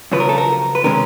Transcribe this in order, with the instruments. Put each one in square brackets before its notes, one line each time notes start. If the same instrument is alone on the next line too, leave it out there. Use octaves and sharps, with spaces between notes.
[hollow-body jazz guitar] F#2 C#3 F3 B4
A#4
A4
A#4
B4
C3 D#3 G#3 C#4 A#4